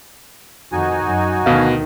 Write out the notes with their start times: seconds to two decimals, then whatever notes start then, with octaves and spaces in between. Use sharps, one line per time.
0.72 F2 D#3 D#4 F#4 G#5
1.04 F#2
1.46 D2 B2 D#3 B4 F5